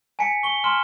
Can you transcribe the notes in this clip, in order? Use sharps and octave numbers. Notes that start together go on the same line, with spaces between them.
G#5 A5 B6 C#7
C#6 G7
G#5 A#5 C6 F6 E7